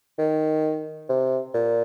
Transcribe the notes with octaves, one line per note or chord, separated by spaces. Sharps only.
D#3
C3
A#2